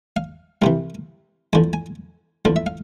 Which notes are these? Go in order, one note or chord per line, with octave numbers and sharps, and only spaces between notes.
F5
C2 C3 E3 F5
E2 D3 F3 G#5
G#5
E2 D3 F3 F5
E5
F5